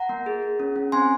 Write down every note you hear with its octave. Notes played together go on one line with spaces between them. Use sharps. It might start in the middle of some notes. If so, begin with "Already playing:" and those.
Already playing: F#5 A#5
A#3
G#4
G#4
C#4
C#4
C4 G#5 C6